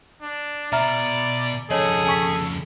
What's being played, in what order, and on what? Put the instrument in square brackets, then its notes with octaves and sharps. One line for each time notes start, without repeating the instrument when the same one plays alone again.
[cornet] D4
[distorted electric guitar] B2 [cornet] D5 [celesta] E5 A#5 F6
[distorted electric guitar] F2 C#3 [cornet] G#4 [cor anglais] A4 [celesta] C#5 D#5
[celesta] G#5 C#6 B6